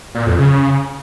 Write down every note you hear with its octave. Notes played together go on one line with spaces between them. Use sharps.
A#2
F2
C#3